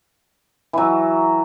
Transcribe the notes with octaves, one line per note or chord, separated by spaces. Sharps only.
E3 F#3